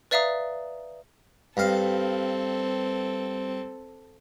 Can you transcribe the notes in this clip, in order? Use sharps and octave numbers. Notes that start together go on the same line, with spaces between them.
B4 D5 E5 F5 A#5 D#6
G2 C4 A4 F5